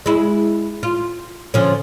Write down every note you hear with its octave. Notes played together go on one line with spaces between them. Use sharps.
G#3 E4
F4
D3 F3 C#4